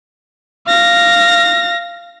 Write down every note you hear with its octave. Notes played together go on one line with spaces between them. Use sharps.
F5 A#6